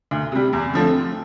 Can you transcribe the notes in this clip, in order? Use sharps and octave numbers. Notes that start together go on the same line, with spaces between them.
D2
C3 G3
E2
D3 F3 A3 C4